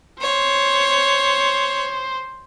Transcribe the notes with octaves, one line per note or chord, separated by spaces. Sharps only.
C5 C#5